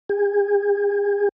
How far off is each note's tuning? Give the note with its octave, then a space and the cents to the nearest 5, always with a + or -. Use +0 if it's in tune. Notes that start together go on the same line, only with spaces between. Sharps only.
G#4 -40